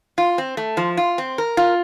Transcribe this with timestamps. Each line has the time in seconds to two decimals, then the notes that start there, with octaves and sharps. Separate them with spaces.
0.18 F4
0.38 C4
0.57 A3
0.77 F3
0.97 F4
1.18 C4
1.38 A#4
1.57 F4